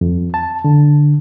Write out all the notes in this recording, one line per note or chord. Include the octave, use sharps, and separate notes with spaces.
F2
A5
D3